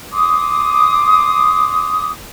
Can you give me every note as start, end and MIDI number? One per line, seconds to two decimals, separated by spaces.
0.13 2.11 84
0.13 2.11 86
0.13 2.11 87